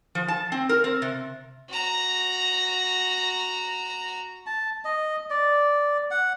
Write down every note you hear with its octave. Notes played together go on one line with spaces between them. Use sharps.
F3
A5
C4
A#4
C4
C3
F#4 A#5
A5
D#5
D5
F#5